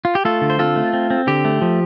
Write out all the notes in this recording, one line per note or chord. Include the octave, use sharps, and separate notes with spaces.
F4
G4
A3 F4 A4
D3
C5
C4 F4 A4
A3
C4
C4
D3 G4
A3
F3